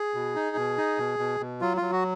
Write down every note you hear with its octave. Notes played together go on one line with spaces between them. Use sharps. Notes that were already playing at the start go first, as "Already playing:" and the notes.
Already playing: G#4
B2
D#4
B2
D#4
B2
B2
B2
F#3 F4
F#3 F4
F#4